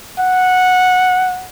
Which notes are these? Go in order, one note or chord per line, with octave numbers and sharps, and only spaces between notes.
F#5